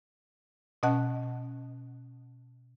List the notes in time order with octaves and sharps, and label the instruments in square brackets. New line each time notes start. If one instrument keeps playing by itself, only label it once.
[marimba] B2 C#4 D#5 F#5 A5 F#6